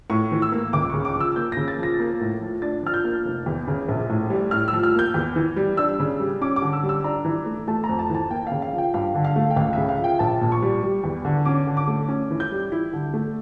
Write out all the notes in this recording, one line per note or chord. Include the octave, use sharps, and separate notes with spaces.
A2 C#6
E3
E6
A#3
C#2 D6
C#3 C#6
D6
F3 E6
A#3 G6
C#3 A#6
A6
F3 A#6
A#3
A2
F3
D4 A6
F3 F6
G6
A#3
F1
E2
C#3
A#1
A2
G3
A2 F6
E6
F3
F6
A#3 G6
E2
E3
G3
D4 E6
C#3
G3
C#4 D6
D6
D3
E6
G3
E6
D4 A#5
E3
A3
A3 A5
A#5
F2
A5
E3 A5
A#3 G5
C#3 F5
F5
F3
G5
G2 F5
D3
F5
A3
G5
C#2 F5
C#3 E5
F5
F3
G5
A#1 A5
A#2
C#6
G3
G3
E2
D3
C#4 D6
D3
D6
A3
C#4
E3
G6
G3
E4
D3
A3